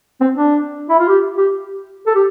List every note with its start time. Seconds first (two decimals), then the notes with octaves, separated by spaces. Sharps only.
0.21 C4
0.35 D4
0.89 E4
0.99 F4
1.08 G4
1.37 G4
2.07 A4
2.15 G4